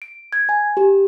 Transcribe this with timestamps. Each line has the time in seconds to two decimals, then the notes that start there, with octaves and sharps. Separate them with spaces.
0.02 D7
0.33 G#6
0.49 G#5
0.77 G4